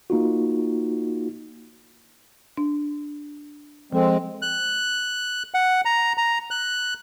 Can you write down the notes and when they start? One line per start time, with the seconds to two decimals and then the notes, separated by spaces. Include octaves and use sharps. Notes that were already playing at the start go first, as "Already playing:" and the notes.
0.10 A#3 D#4 F4 F#4
2.57 D4
3.93 F3 G#3 C4 A4
4.42 F#6
5.54 F#5
5.85 A#5
6.18 A#5
6.51 F#6